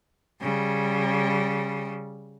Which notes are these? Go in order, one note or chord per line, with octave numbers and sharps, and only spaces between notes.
C#3 G3